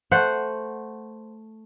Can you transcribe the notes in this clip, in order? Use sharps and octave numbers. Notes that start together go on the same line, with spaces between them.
A3 C5 F#5